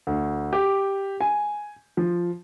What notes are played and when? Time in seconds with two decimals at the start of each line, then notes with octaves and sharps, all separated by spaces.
0.07 D2
0.53 G4
1.21 G#5
1.97 F3